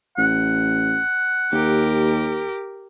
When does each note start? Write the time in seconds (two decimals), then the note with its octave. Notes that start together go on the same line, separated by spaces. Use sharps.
0.18 A1 F#5
1.53 D#2 G4 A#4